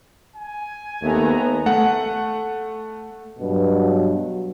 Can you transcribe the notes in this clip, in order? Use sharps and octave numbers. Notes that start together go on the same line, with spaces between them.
G#5
D#2 A3 B3 A#5
A3 F#5
G2 B2 F#3